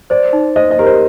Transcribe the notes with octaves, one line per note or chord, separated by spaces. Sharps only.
C5 D5
D#4
C5 D#5
D#5
G4 A#4
C5